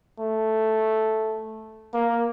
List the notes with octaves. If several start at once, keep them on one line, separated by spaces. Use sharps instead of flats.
A3
A#3